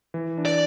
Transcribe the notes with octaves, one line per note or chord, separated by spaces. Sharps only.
E3
D4
D5